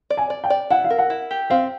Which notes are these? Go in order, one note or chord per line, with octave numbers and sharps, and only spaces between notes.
D5
G#5
D5
G5
D5
E4 F#5
F5
A#4
F#5
E4
G4
C4 F5